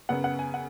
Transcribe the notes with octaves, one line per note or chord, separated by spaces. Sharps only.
F#2 C#3 B3 F#5
F#5
G#5
F#5